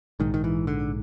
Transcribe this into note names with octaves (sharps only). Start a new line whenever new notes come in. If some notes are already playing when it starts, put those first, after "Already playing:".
A#1 G#2 D#3
D#3
E3
D3